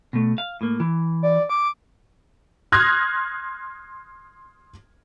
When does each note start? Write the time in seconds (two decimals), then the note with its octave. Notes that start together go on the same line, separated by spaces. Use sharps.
0.13 B2 A3
0.38 F5
0.61 A2 A#3
0.80 E3
1.23 D5
1.49 D6
2.72 C6 D#6 F6 F#6 G#6 A#6